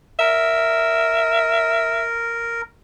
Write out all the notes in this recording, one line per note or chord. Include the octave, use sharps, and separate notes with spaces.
A#4 E5